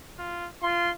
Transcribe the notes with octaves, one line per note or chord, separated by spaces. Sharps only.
F4
F4 C6